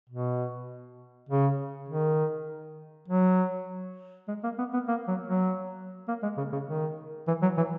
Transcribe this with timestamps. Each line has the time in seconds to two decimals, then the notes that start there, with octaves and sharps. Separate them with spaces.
0.10 B2
1.29 C#3
1.89 D#3
3.08 F#3
4.28 G#3
4.43 A#3
4.58 B3
4.73 B3
4.88 A#3
5.08 F#3
5.28 F#3
6.08 A#3
6.22 G#3
6.37 C#3
6.52 C#3
6.68 D#3
7.28 E3
7.42 F#3
7.57 E3